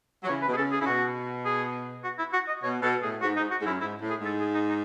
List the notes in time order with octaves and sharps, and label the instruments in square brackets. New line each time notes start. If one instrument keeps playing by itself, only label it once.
[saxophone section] F#3
[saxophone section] C#3 E3 [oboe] C#5
[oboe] B4
[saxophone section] B2
[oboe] G#4
[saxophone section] C#3 [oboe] A4
[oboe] G#4
[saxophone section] C#3 [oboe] E4
[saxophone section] B2 [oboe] F#4
[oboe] G#4
F#4
E4
F#4
D#5
[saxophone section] B2 [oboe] C#5
[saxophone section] B2 [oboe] A4
[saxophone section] A2 [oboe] G#4
[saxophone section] G#2 [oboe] F#4
[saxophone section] G#2 [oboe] D#4
[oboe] F#4
[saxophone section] G#2
[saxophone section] F#2 [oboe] E4
[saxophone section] G#2 [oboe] E4
[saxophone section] A2
[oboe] G#4
[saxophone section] G#2 [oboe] A4
[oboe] G#4
D#4
D#4